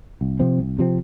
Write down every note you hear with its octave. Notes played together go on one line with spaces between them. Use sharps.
C2
C3 F3 C4
C2
C3 F3 C4